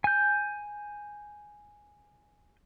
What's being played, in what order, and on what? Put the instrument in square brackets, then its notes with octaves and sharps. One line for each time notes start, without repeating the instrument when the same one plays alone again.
[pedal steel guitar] G#5 G6